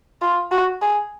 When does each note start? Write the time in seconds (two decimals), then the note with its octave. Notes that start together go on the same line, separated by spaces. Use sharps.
0.22 F4
0.51 F#4
0.82 G#4